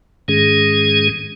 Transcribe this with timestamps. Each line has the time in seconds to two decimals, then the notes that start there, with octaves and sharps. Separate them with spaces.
0.28 G#2 D#3 G#3 C#4 G#4